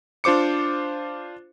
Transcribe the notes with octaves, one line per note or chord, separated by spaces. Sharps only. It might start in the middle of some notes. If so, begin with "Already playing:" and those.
D4 F4 C5 D6 C#7